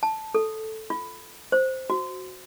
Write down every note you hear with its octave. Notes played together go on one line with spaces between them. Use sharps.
A5
A4
F4
C5
F#4